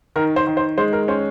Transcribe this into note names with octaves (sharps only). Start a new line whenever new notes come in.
D#3 A#4
C5
D#3
C5
G#3 C5
A#4
C#4 C5